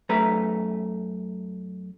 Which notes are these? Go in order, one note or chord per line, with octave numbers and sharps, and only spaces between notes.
F#2 A3 B4 A#5